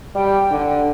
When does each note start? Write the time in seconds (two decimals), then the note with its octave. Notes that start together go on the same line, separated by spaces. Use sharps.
0.15 G3 G4 G5
0.51 D3